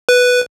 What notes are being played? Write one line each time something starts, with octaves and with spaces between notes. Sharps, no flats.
B4